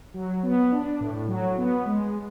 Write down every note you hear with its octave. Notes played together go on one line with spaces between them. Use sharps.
F#3
B3
D4
A2
F#3
B3
G#3